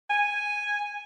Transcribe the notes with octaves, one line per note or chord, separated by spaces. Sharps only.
G#5